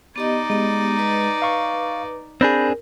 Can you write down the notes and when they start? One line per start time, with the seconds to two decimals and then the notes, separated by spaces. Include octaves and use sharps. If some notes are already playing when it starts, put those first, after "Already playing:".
0.16 B3 D#4 G4 D5 D#5
0.50 G#3 B3 G4 A#5
0.99 B4 D6
1.42 F5 C#6
2.41 C4 D4 G#4 A#4 B5 G6 A#6